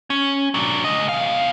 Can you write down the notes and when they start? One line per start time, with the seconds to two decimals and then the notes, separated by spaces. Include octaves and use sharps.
0.10 C#4
0.54 F#3 D4
0.84 C#2 D#5
1.09 E2 F5